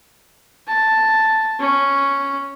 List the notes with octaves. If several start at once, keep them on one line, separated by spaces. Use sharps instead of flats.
A5
C#4